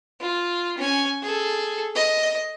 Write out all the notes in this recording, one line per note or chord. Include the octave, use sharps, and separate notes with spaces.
F4
C#4 G#5
G#4 A4
D#5